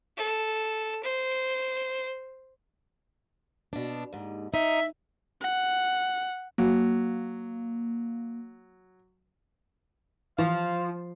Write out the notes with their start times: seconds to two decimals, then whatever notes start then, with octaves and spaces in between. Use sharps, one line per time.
0.17 A4
1.03 C5
3.73 B2 D4
4.13 D#2 G#2
4.54 D#4 E5
5.41 F#5
6.58 F#3 A#3
10.39 E3 F3 F5